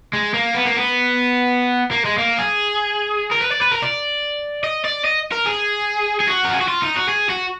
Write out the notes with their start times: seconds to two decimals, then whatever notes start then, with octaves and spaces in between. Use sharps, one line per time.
0.13 G#3
0.34 A#3
0.54 B3
0.65 A#3
0.76 B3
1.91 A#3
2.05 G#3
2.18 A#3
2.38 G#4
3.31 A#4
3.41 B4
3.52 D5
3.62 B4
3.72 A#4
3.83 D5
4.64 D#5
4.85 D5
5.05 D#5
5.32 A#4
5.46 G#4
6.20 G#4
6.27 F#4
6.44 A#4
6.53 G#4
6.61 F#4
6.68 F4
6.82 D#4
6.96 F#4
7.09 G#4
7.30 F#4